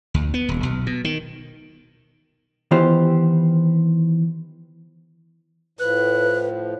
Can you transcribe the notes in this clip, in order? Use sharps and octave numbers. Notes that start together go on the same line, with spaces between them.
D2
B3
D#1
B1
B2
D#3
D#3 E3 B3 F4 G4 C5
A2 F3 B4 F#6